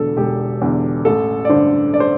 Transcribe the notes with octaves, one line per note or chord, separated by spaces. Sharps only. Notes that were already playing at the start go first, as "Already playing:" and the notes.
Already playing: E1 E2 D3 A4
E1 G4
E2 D3
A1 A4
D5
G2 D3 C5
D5
C5